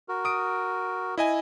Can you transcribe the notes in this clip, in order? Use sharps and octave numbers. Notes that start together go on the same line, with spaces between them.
F#4 A#4
D#6 D7
E4 D#5 G#5